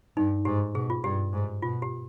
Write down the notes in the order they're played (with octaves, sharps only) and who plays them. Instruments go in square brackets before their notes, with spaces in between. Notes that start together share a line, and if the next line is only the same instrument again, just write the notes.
[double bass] G2 [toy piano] D#4
[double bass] G#2 [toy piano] G4
[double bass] B2 [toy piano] G#4
[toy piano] F4
[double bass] G2 [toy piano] G4
[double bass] G#2
[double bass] B2 [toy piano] F4
[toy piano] G4